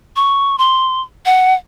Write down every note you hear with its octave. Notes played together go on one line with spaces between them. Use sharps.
C#6
C6
F#5